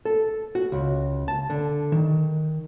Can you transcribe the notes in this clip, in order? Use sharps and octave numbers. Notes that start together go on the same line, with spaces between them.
A4
F#4
C#2
A5
D3
D#3